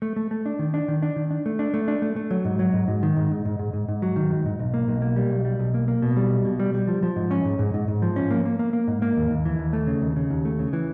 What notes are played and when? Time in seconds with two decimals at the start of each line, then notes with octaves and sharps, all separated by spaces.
0.02 A3
0.16 A3
0.31 A3
0.46 D4
0.59 D#3
0.74 D4
0.88 D#3
1.02 D4
1.16 D#3
1.31 D4
1.46 A3
1.59 D4
1.74 A3
1.88 D4
2.02 A3
2.16 A3
2.31 F#3
2.45 G#2
2.59 F#3
2.73 G#2
2.88 G#2
3.03 D#3
3.16 G#2
3.31 G#2
3.45 G#2
3.59 G#2
3.73 G#2
3.88 G#2
4.02 F#3
4.16 D#3
4.31 G#2
4.46 G#2
4.59 B1
4.74 A#3
4.88 B1
5.02 A#3
5.16 G3
5.30 B1
5.45 G3
5.59 B1
5.74 A#3
5.88 A#3
6.02 B2
6.16 G3
6.31 B1
6.45 B2
6.59 G3
6.74 G3
6.88 F3
7.03 F3
7.16 G#2
7.31 C#4
7.45 G#2
7.59 G#2
7.74 G#2
7.88 G#2
8.02 F3
8.16 C#4
8.31 A#3
8.45 A#3
8.59 A#3
8.73 A#3
8.87 G#2
9.02 A#3
9.17 D#2
9.31 D#2
9.45 E3
9.59 D#2
9.73 A3
9.87 C#3
10.02 D#2
10.16 C#3
10.30 D#2
10.45 A3
10.59 C#3
10.73 E3